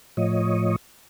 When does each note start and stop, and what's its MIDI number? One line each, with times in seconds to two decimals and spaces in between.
0.17 0.76 45
0.17 0.76 53
0.17 0.76 73
0.17 0.76 75